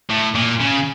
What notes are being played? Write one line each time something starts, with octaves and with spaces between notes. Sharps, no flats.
A2
A#2
C#3